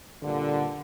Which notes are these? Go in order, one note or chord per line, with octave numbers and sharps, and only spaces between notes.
G2 A#2 D3